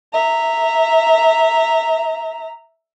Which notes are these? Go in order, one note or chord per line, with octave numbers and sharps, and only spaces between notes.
E5 A#5